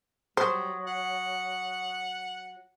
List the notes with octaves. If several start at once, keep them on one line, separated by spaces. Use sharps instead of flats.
F#3 G3 C5 C#6 D#6
F#5